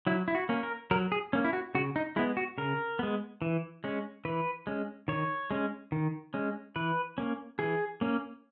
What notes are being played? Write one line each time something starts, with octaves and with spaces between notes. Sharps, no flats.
F#3 E4
E4
F#4
A#3 C#4
A#4
F#3 A#4
G#4
A#3 C#4
E4
F#4
C#3 F#4
D#4
G#3 B3 E4
F#4
C#3 A#4
G#3 B3
E3
G#3 C#4
E3 B4
G#3 C#4
D#3 C#5
G#3 C#4
D#3
G#3 C#4
E3 B4
A#3 C#4
E3 G#4
A#3 C#4